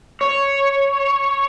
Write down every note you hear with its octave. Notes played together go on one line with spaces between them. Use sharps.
C#5